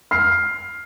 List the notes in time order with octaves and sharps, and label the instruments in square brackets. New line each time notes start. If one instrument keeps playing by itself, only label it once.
[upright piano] F6 C7